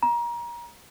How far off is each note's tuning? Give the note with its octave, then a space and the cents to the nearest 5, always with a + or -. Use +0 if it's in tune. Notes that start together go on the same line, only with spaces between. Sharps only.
A#5 +30